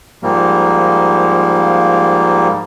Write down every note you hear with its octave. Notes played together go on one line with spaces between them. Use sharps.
G#2 F3 G3 A#3